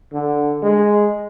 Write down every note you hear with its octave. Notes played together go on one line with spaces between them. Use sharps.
D3
G#3